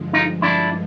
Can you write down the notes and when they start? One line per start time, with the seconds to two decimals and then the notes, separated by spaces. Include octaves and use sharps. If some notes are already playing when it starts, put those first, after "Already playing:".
Already playing: G2 D3 F3 G#3
0.13 D#4 F4
0.42 D4 E4